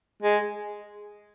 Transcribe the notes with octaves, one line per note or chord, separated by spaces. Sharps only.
G#3